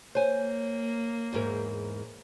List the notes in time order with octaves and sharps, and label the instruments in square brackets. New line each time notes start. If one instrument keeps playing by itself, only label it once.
[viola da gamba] A#3 [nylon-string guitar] C5 G#5 [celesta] C#5
[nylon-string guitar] E2 G#2 A#4